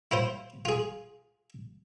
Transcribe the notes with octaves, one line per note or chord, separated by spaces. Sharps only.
E4 F4 C5
F4 G#4